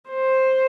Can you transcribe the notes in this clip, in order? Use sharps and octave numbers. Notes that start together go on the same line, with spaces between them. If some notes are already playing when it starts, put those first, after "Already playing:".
C5